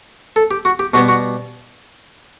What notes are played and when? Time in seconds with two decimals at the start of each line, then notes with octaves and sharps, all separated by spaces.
0.36 A4
0.51 G4
0.65 F#4
0.79 G4
0.93 B2 G3 B3 F#4
1.09 F#4